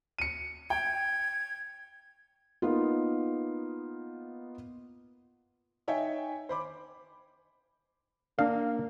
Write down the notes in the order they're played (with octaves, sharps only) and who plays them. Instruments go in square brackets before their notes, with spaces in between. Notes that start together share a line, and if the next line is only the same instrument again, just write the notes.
[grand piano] C#7 D#7
[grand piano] G5 [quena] G#6
[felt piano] A#3 B3 D#4 F4
D#4 C#5 E5 G5 G#5
C5 B5 D6
[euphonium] A#3 [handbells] D4 D5 [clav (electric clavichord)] F5